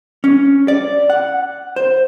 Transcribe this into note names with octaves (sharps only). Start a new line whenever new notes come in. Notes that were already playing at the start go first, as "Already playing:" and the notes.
C#4
D5
F#5
C5